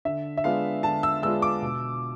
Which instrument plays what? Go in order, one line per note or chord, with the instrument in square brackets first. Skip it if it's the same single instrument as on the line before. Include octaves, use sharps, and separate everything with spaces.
[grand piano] D3 E5
E5
G#3 B3 D4 F4 F5
D3 A5
E6
G#3 B3 D4 F4 E6
D6
B2